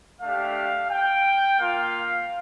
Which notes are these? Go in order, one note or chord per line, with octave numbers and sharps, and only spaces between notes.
A3 D4 G4 F5
G5
A#3 F4 F5